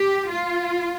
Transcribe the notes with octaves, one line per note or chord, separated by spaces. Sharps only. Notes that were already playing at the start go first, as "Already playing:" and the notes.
Already playing: G4
F4